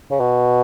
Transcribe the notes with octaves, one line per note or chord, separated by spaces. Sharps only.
C#3
B2